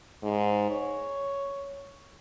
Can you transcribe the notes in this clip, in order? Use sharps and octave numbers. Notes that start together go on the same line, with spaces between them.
G#2
C#5